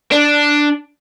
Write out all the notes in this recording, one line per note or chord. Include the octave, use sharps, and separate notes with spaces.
D4